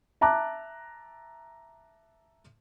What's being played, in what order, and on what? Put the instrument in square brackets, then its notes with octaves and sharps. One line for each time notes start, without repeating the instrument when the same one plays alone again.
[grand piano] E5 A5 A#5 D6 F#6